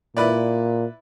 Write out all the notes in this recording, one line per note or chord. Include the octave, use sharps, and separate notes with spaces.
A#2 E4 B4 D5